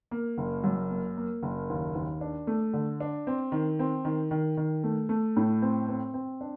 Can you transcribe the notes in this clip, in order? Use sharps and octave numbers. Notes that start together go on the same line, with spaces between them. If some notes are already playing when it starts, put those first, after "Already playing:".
A#3
F#1
F#2
A#3
A#3
F#1
D#2
D#2
D4
A3
D3
D4
C4
D#3
C4
D#3
D#3
D#3
A3
A3
A2
C4
C4
C4
D4